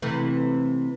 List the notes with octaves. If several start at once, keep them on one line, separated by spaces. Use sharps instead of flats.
C3 E3 A3